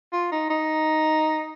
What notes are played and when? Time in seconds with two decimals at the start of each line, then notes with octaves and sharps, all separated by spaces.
0.13 F4
0.32 D#4
0.50 D#4